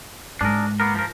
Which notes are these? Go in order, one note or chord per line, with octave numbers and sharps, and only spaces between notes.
G#2 D4 G#4 A#4
A#3 B3 A#4
F3 A#4